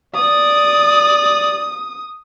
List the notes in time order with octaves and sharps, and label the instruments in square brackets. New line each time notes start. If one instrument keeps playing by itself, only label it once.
[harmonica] D5 [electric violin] D#6